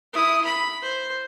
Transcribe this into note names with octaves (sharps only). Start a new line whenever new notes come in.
E4 D#6
B5
C5